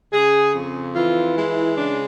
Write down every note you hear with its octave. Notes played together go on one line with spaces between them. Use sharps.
C#3 G#4
F2
E3 F4
G#3 E4
C#3 D4